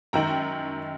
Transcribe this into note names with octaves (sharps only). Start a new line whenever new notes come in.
F#2 D#3 G5 A#5